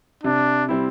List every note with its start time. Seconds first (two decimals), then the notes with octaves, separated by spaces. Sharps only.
0.23 C3 D4
0.69 G3 C4 E4